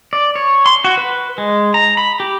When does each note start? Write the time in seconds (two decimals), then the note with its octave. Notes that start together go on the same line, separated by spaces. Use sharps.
0.13 D5
0.36 C#5
0.66 C6
0.84 F#4
0.97 B4
1.38 G#3
1.74 A#5
1.97 B5
2.20 G4